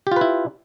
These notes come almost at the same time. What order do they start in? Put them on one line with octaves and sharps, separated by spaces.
G4 F4 B4 E4